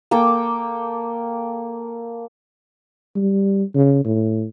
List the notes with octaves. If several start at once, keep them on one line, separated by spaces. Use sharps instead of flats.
A#3 A4 G5 D6
G3
C#3
A2